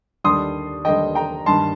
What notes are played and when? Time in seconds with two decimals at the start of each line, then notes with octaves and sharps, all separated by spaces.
0.24 D#2 D3 G3 D4 C6 D#6
0.85 D#2 D3 G3 D4 D#5 G5
1.15 G5 A#5
1.46 G2 D#3 G3 D4 A5 C6